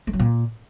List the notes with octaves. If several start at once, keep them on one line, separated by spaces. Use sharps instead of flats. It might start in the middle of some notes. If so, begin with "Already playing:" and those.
A3
F#3
A#2